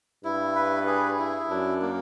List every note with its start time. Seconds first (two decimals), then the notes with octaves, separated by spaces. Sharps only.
0.24 G2 E4
0.56 B4
0.87 G#4
1.19 E4
1.50 F#2 D4
1.82 A#3